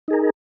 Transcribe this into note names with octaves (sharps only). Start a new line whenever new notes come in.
D#4 G#4 A#4